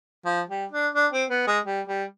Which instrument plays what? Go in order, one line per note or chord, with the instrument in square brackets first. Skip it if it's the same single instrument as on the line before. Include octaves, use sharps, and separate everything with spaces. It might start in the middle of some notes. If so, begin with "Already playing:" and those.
[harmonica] F3
G3
D4
D4
C4
B3
G#3
G3
G3